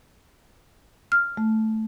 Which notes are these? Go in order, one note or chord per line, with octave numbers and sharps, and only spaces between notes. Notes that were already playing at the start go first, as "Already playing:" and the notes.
F6
A3